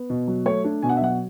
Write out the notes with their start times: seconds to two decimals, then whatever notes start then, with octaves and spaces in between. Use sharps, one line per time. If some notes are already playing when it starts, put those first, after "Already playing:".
Already playing: B3
0.10 B2
0.27 F#3
0.45 A3 C#5
0.64 D4
0.82 B2 G#5
0.89 F#5
0.97 E5
1.01 F#3 F#5